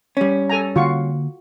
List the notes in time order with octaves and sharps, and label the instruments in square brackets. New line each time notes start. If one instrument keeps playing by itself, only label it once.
[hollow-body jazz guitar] G3 C#4
[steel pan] A4 G#5 A#5
[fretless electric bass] D3 A#3 [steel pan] F4 F#4 C#6